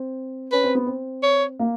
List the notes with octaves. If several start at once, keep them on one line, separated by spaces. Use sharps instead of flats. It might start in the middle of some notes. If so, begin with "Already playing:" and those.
Already playing: C4
C#4 B4
C4
B3
C4
C#5
A#3